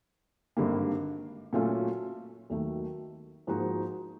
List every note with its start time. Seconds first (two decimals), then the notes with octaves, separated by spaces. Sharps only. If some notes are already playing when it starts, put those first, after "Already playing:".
0.57 G#1 G2 D3 G3 A#3
1.53 A#2 F#3 A3 C#4 F4
2.50 D#2 D#3 F#3 A3
3.47 G#2 F3 A#3 D#4 F#4